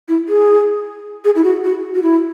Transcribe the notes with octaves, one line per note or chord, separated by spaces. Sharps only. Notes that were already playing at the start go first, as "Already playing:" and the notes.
E4
G#4
G#4
E4
F#4
F#4
F#4
E4